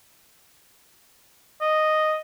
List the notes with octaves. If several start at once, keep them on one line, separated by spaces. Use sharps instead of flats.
D#5